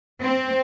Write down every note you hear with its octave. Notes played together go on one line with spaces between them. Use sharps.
C4